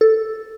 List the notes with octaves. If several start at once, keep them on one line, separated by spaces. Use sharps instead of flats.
A4